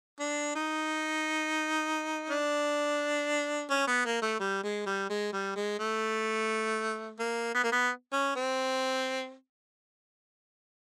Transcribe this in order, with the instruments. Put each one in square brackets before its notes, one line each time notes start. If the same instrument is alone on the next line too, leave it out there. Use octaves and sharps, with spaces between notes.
[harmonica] D4
D#4
D4
C#4
B3
A#3
A3
G3
G#3
G3
G#3
G3
G#3
A3
A#3
B3
A#3
B3
C#4
C4